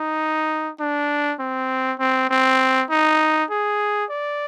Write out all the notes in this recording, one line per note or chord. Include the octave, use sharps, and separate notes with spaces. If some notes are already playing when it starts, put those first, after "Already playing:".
Already playing: D#4
D4
C4
C4
C4
D#4
G#4
D5